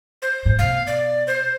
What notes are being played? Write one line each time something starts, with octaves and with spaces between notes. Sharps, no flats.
C5
G#2
B2 F5
D5
C5